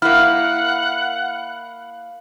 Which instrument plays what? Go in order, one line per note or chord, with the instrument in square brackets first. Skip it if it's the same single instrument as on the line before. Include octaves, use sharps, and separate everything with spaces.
[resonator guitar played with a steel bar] A#3 E4 [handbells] F5 B5 [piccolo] F#5 [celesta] F6